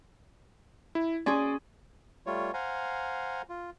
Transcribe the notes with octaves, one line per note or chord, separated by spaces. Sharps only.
E4
C#4 G#4 D5 C6
G3 A3 F4 C#5
C5 F5 F#5 G#5 A#5
F4